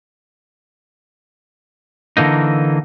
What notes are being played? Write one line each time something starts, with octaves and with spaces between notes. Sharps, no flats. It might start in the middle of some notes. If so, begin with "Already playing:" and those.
D3 E3 A#3 D#4